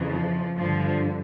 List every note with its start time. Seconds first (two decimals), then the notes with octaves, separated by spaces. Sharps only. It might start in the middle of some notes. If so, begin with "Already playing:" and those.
Already playing: F2 C#3 E3
0.11 F3
0.57 G2 D3 F3